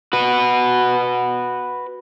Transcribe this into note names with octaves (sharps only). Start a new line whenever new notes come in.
F#4 B4